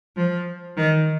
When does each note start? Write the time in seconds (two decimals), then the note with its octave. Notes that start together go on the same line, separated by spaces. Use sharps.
0.17 F3
0.77 D#3